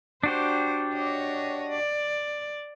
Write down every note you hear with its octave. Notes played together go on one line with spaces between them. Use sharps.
D4 F#4 G4 C5
C#5 D#5
D5